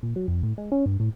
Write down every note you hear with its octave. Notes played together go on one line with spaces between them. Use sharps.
A#2
F#3
F2
A2
G#3
C#4
G2
A2